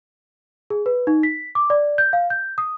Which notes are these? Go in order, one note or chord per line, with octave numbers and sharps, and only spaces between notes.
G#4
B4
D#4
B6
D6
D5
G6
F5
G6
D#6